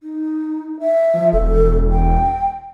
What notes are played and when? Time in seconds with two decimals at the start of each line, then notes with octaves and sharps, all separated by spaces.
0.03 D#4
0.80 E5
1.14 F3
1.33 E1 A4
1.91 G5